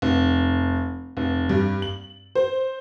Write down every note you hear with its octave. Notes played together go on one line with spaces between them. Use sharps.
F1
F1
G2
F#7
C5